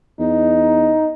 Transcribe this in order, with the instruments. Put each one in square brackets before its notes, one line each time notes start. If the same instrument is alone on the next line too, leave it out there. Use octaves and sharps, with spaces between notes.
[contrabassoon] E2 [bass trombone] D#4